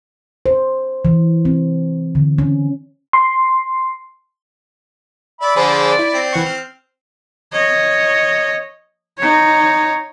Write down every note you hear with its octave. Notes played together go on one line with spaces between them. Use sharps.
C5
E3
C4
D3
C#4
C6
D5 E5 B5
D3 F3 G#4 C5 B5
E4
C4
E3 F#5 C#6
F6
C#5 D#5
D#4 C#5